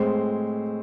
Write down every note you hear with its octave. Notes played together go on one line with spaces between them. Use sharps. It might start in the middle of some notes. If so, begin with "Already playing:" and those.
Already playing: A2 G#3 C4 C5